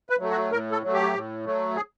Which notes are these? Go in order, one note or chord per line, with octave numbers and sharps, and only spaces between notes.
B4
F#3 A3
F#4
A2 A#4
A4
F#3 A3
G4
A2
F#3 A3
G#4